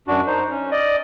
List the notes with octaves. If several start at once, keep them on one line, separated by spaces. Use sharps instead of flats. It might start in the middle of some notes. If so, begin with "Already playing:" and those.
F#2 D4 F#4
D#4 C5
C#4
D5 D#5